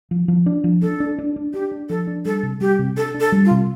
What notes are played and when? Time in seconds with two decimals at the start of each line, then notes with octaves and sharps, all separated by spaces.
0.11 F3
0.28 F3
0.46 D4
0.64 F3
0.82 D4 A4
1.00 D4
1.19 D4
1.36 D4
1.53 D4 G4
1.72 D4
1.89 F3 A4
2.07 D4
2.25 G3 A4
2.43 C3
2.61 G3 G4
2.79 C3
2.97 D4 A4
3.14 D4
3.20 A4
3.32 G3
3.45 F4
3.51 C3